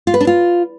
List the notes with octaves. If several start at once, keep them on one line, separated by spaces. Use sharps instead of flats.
F4
B4
D4
F4